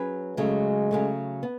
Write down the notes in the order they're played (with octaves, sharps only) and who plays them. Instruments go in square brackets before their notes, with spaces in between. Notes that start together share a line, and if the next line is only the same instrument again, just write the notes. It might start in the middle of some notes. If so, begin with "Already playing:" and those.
Already playing: [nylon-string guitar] F#3 C#4 G#4 B4
[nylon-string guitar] C#3 F#3 A3 [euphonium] G#3
[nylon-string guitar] C#3 F#3 A3
B3